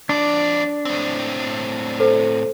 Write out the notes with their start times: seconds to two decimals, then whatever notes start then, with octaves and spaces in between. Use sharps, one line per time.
0.09 F2 D4 D5
0.85 A2 C4
2.00 A4 C5